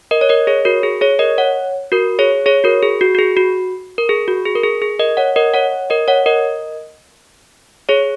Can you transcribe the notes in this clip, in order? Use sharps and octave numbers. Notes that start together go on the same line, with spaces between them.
A#4 D#5
C#5
A#4 D#5
G#4 C#5
F#4 A#4
G#4
G#4 C#5
A#4 D#5
C#5 F#5
F#4 A#4
G#4 C#5
G#4 C#5
F#4 A#4
G#4
F#4
F#4
G#4
F#4
A#4
G#4
F#4
G#4
A#4
G#4
G#4
A#4 D#5
C#5 F#5
A#4 D#5
C#5 F#5
A#4 D#5
C#5 F#5
A#4 D#5
G#4 C#5